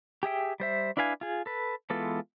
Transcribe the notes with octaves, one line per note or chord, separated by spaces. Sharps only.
G4 G#4 E5 G5
G3 C5 E5
D4 E4 B4 F5 G#5
F4 G#4
A4 B4
E3 G#3 B3 F4 A4